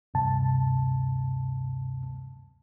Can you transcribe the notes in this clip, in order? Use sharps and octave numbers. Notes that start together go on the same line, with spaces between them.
D2 G2 C3 A5